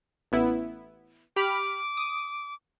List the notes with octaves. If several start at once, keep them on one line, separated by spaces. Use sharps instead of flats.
A1 B3 E4
G4 B5 D6 F6
D#6